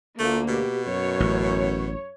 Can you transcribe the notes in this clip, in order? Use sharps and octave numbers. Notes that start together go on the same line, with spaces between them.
D2 A3 A#3 F4
B2 G4
F#2 C#5
A1